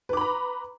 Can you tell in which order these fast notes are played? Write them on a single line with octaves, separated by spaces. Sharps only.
B4 D6 B5 A#5